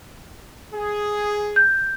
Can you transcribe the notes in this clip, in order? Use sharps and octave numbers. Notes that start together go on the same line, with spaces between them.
G#4
G6